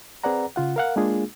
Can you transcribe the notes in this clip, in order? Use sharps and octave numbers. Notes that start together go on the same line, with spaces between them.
C4 G#4 B4 D5 F#5 A#5
C#3 F4 F#5
A#4 F5 F#5
G#3 A#3 D4 F4 G#4